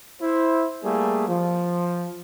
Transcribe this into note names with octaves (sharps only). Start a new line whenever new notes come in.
E4 C5
G3 A3 A#3 G#4
F3